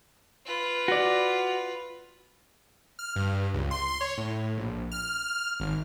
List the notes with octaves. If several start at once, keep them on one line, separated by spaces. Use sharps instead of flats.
F4 B4
F#4 D5
F6
G2
C#2
C6
C6
C#5
A2
A#1
F6
G#1